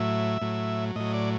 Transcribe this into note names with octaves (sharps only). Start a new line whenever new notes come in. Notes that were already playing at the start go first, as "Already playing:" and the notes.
Already playing: A2 F#3 E5
A2 F#3
A2 F#3 D#5
D5